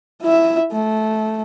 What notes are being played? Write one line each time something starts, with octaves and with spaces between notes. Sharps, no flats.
E4 E5
A3